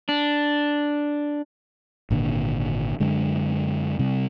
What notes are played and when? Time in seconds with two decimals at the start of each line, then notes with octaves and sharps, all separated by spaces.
0.09 D4
2.10 G#1 A#2 D3
3.00 F#2 D3 G#3
3.99 C3 G3